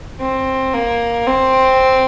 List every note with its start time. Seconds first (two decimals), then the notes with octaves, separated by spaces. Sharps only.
0.21 C4
0.74 A#3
1.27 C4